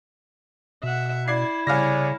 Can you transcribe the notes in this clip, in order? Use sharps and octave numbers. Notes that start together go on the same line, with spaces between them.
B2 E5 F#5
E4 D5 G#6 C7
C2 C#3 C#5 D5 G#5 F6 A#6